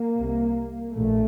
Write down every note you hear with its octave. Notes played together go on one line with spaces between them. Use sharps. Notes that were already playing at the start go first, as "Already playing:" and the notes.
Already playing: A#3
C2 C3
A#1 A2 A3